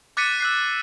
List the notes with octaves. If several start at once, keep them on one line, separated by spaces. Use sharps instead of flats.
D6 F#6 A6 B6 C#7 D#7
E6 F#6 C7